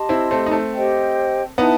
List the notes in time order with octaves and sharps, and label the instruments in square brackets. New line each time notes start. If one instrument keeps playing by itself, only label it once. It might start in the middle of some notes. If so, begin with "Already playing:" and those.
Already playing: [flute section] G4 D#5 A5 C6
[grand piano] C4 E4
A3 C4
D#4
A3 C4
[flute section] G4 C5 D#5 G5
[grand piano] B3 D#4 [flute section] E4 B4 E5 A5